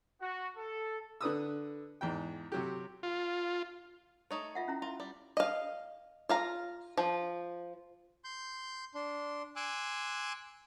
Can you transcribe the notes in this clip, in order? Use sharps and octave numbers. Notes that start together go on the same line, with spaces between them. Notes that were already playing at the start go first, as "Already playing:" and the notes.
F#4
A4
D3 B4 D#6 E6
E2 G#2 G5
C3 F#3 G4
F4
A3 D#4 C#5
F4 E5 F#5
C#4 E4 A#5
E4 F4 E5
G3
D#5 F5
F4 F5 A#5
F3
C6 G6
D4 C6
G#5 C6 D6 E6 F#6